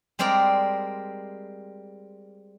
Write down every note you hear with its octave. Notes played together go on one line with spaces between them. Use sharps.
G3 G#3 C4 A#4 D5